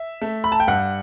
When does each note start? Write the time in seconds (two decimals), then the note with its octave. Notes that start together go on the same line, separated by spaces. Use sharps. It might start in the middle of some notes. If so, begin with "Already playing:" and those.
Already playing: E5
0.21 A3
0.44 B5
0.52 A5
0.60 G5
0.68 G2 F#5